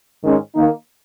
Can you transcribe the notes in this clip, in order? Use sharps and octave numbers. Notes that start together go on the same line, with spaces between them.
G#2 D#3 G#3 C#4
D#3 A#3 D#4